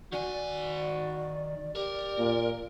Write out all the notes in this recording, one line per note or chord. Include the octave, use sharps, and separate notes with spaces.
D#3 F#4 D5 G#5
G4 A#4 D5
A#2